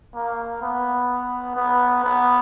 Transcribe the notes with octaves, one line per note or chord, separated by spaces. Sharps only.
A#3
B3
B3
B3